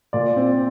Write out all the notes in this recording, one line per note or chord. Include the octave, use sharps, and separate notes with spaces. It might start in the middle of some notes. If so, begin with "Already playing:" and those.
A#2 D5
C4